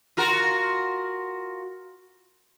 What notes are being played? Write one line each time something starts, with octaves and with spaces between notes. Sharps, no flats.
F4 F#4 A#4